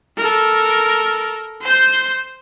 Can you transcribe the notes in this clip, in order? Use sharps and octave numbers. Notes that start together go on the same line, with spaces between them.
A4 A#4
C5 G6